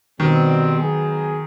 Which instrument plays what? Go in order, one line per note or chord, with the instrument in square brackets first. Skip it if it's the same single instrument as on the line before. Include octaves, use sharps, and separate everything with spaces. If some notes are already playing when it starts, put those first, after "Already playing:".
[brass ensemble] B2 G3 C4 [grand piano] D#3
[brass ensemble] F#3 B3 D#4 G#4